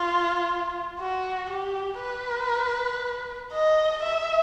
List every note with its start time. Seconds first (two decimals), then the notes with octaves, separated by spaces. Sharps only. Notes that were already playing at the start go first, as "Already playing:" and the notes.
Already playing: F4
1.00 F#4
1.50 G4
2.01 B4
3.53 D#5
4.03 E5